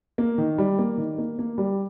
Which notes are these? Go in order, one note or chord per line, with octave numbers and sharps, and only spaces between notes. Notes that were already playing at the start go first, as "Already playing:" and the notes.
A#3
D#3
G3
A#3
D#3
A#3
A#3
G3